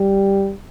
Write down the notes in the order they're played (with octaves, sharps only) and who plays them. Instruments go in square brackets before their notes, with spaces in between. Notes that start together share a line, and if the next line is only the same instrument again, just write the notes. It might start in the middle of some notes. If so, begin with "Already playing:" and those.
Already playing: [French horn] G3